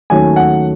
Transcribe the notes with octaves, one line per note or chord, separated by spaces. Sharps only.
D#2 D#3 F#3 A3 C#4 G#5
F#5